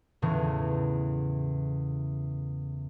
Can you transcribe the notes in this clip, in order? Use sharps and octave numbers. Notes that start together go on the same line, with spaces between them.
E2 A2 C#3 E3